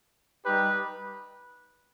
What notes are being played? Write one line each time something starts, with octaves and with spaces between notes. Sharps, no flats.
G3 D#4 G4 B4